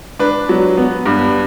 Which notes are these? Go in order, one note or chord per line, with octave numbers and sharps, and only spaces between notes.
D4 B4
F#3
B3
G2